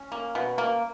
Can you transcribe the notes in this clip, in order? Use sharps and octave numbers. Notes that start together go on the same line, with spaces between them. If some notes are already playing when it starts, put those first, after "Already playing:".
Already playing: C#4
A#3
B2
A#3